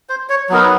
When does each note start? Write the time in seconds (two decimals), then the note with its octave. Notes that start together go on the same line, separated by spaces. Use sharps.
0.09 C5
0.29 C#5
0.50 F#3 B3 D#4 A#4
0.62 B4